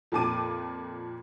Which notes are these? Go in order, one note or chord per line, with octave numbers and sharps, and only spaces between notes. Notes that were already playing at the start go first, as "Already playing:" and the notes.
F2 A#2 A#3 A5 D6 D#7